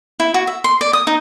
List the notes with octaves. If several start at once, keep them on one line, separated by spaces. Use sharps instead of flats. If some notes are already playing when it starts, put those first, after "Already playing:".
E4
F#4
E5
C6
D5
D#6
D#4